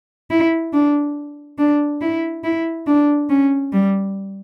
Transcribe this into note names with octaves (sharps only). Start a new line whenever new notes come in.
E4
D4
D4
E4
E4
D4
C#4
G3